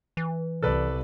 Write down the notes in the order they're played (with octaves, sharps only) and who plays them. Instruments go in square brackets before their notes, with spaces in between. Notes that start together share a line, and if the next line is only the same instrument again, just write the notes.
[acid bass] E3
[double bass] C2 [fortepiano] A4 B4 D5